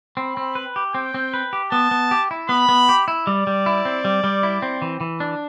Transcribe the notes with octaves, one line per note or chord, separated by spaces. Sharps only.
C4 B5
C4
B4
G4
C4 G5
C4
B4
G4
B3 A5
B3
G4
E4
B3 B5
B3
G4
E4
G3 D5
G3
E4
C4
G3
G3
E4
C4
E3
E3
D4